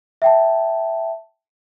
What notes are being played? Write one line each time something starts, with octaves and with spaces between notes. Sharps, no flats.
E5 G5 A5